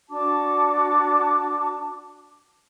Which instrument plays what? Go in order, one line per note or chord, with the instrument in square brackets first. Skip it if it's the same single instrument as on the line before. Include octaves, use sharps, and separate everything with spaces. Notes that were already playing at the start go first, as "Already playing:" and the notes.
[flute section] D4 F#4 A5 D6